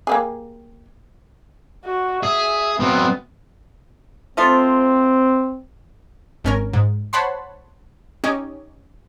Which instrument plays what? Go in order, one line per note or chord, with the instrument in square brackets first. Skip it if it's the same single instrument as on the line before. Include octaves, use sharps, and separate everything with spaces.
[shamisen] A#3 G4 G#4
[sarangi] F#4
[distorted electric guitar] G#4 [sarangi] E5
[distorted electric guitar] F#3 C4 [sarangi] B3
[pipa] F3 A3 F4 [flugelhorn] C4
[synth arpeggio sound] G#1 C#4 A#4
G#2
C5 C#5 F#5 A5 B5 C6
C#4 D#4 G4